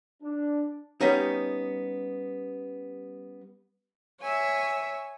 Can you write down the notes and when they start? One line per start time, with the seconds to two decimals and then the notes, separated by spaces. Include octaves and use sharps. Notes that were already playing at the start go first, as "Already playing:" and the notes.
0.22 D4
1.01 G3 B3 C#4 D#4
4.22 C#5 E5 G#5